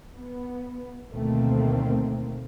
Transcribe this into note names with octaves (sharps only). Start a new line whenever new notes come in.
B3
D2 B2 D#3 A3 A#3 C4